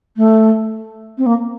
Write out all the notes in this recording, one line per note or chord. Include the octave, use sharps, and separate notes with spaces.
A3
C4
A#3